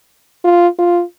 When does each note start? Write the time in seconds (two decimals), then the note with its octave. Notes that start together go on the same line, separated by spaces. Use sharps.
0.44 F4
0.79 F4